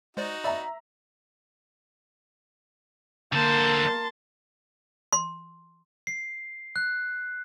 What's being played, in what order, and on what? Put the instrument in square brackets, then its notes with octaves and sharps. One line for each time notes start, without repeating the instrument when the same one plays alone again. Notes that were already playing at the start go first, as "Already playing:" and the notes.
[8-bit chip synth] G#3 C5 D5 [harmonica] D#4 F#4
[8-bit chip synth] D5 B5 [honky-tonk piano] E5 A#5
[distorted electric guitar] D3 C5 [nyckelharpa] A#3 A#4 [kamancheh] A5 C6
[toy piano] C6
[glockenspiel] C7
F#6